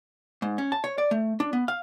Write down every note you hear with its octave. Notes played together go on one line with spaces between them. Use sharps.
G#2
C#4
A5
C#5
D5
A3
D4
B3
F5